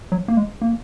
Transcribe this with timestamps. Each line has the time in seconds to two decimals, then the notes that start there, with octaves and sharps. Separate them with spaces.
0.12 F#3
0.28 A#3
0.37 G#3
0.62 A#3